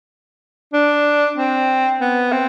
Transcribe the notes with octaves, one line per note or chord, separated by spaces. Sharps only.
D4
C4
B3
C4